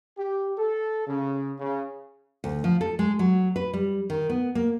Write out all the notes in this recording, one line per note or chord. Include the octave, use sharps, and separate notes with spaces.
G4
A4
C#3
C#3
D2
F3
A4
G#3
F#3
B4
G3
D#3
B3
A#3